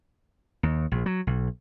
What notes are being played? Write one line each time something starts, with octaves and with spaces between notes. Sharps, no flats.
D#2
A#1
F#3
B1